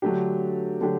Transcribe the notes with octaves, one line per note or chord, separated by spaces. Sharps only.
D3 F#3 A3 D4 G4
D3 F#3 A3 D4 G4